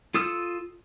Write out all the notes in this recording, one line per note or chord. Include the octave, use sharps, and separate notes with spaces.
F4 A4 D#6 E6